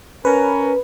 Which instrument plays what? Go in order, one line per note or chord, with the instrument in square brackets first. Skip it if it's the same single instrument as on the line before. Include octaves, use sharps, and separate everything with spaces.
[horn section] C#4 A#4 [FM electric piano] B4